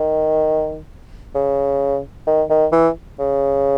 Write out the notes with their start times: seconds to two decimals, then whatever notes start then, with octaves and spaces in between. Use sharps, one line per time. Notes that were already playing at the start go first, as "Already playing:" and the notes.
Already playing: D#3
1.35 C#3
2.27 D#3
2.50 D#3
2.72 E3
3.19 C#3